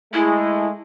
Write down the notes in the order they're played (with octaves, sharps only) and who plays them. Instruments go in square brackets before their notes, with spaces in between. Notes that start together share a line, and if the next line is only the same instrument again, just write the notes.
[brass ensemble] G#3 A3 [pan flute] E4